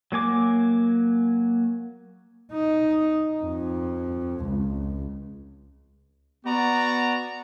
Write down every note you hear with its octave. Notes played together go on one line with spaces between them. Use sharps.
F#3 A#3 G#5 D6
D#4
F2
C#2
B3 F#4 D5 A#5